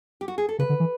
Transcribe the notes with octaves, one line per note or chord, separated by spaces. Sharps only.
G4
F#4
G#4
A4
C#3 B4
D3
E3